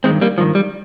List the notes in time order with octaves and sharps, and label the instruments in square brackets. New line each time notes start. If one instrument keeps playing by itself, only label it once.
[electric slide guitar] D#3 G#3 C4
G2
G3 A#3
G2 D#3 F3
G3